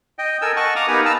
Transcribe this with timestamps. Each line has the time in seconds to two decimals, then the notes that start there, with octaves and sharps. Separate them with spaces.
0.19 D#5 G5
0.42 A4 A#4 G#5 E6
0.56 D#5 F#5 A5 C#6
0.76 F5 A#5 D6 D#6 F6
0.88 B3 D#4 G4 A#4 B4 G#5
1.06 F5 A5 A#5 E6